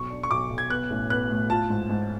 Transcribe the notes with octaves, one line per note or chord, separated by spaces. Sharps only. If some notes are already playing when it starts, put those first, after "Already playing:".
Already playing: B1 C#6
D4
C#6
B1 D6
B1
G#6
B3 F#6
A1
B3 F#6
A2
F4 A5
G#2
G#2